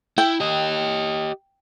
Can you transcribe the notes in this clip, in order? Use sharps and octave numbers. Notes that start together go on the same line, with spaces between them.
E4 G5
G4 D#5